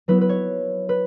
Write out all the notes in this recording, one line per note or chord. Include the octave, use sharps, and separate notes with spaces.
F#3 B3 E4 B4
B4
C#5
B4